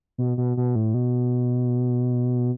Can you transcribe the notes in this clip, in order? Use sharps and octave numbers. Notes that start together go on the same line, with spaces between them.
B2
B2
B2
A2
B2